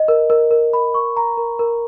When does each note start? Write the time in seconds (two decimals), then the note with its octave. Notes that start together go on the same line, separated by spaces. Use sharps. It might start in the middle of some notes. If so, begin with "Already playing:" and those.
Already playing: D#5
0.08 A#4
0.30 A#4
0.51 A#4
0.73 B5
0.94 C#6
1.17 A#5
1.38 A#4
1.59 A#4